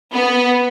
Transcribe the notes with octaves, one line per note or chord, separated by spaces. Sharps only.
B3